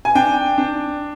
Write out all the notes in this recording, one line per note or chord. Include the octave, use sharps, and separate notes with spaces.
G#5
D4 G5
D4